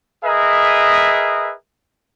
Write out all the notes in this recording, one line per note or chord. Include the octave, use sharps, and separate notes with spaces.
G#4 A#4 B4 D#5 E5